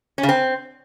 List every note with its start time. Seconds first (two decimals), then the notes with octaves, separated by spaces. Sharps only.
0.18 C#4
0.23 C#3
0.29 C4